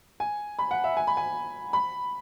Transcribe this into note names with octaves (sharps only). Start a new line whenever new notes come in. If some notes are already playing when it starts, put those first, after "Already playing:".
G#5
B5
F#5
E5
G#5
B5
G#5
B5